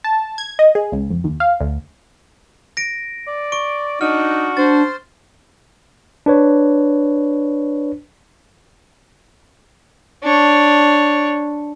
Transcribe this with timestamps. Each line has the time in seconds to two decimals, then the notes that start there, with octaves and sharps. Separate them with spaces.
0.04 A5
0.38 G#6
0.59 D#5
0.75 G#4
0.92 C#2
1.10 F2
1.24 D#2
1.40 F5
1.60 D2
2.77 A#6 D7
3.27 D5
3.52 C#6 D7
4.01 D4 D#4 F#4 F6
4.57 D4 C5 A6
6.26 D4 B4 C#5
10.24 D4 C#5